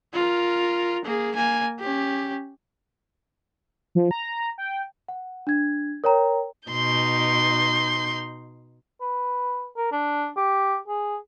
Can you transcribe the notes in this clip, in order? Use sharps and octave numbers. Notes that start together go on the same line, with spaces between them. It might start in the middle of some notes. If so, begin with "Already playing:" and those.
F4 A#4
A#3 G#4
A#3 G#5
C#4 G4
F3
A#5
G5
F#5
D4 G#6
A#4 C#5 G5 A#5
B2 D#4 C6 G6
B4
A#4
D4
G4
G#4